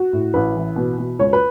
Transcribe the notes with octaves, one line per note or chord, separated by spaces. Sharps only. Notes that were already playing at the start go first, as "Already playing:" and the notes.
Already playing: F#4
A2
A1 B4
E3
B2
B2
C#2 C#5
B4